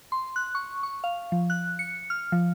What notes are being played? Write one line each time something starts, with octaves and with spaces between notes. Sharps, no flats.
C6
F#6
C#6
C#6
F5
F3
F#6
C#7
F6
F3